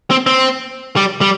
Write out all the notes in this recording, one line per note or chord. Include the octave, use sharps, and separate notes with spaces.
C4
C4
G3
G3